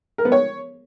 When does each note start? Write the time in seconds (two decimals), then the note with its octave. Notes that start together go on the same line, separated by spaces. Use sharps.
0.18 A#4
0.25 B3
0.32 C#5